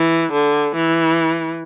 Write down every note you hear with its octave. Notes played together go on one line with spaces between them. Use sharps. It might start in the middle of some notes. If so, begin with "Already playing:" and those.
Already playing: E3
D3
E3